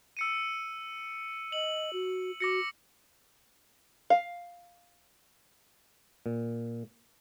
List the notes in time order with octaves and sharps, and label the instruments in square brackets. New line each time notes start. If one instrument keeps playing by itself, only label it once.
[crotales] E6 C#7 D#7
[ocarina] D#5 [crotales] F#7
[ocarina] F#4
[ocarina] F#4 [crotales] D6 A#6 C#7
[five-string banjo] F5
[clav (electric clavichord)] A#2